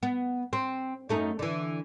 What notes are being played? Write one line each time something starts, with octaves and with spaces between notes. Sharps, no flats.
B3
C4
F#2 A3 D#4
D3 E3